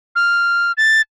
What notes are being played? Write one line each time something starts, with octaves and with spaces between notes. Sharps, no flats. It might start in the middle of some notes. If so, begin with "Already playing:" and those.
F6
A6